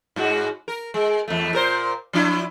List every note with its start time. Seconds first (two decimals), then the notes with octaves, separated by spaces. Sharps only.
0.16 G#2 G#3 F#4
0.68 A#4
0.94 G#3
1.28 E2 A3
1.53 A#2 A#4 C5
2.13 F3 D4 E4